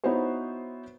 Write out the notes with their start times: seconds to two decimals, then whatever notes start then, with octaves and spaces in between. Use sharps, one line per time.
0.04 B3 D#4 E4 F#4 C5 C#5